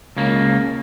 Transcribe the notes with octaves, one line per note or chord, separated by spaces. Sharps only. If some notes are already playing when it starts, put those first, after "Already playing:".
C#2 C#3 A#3